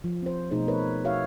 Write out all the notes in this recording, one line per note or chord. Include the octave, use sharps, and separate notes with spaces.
F3
C4 C5
B2 A3 D#4 G#4 C5
A#4 B4 C#5
F#4 C#5 E5 F5